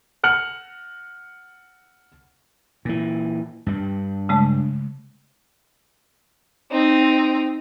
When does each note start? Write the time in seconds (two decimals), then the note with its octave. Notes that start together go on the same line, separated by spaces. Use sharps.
0.23 F#5 F6 C#7 F#7
2.85 A#2 E3
3.66 G2 G3
4.29 C#3 G#3 A3
6.72 C4 D#4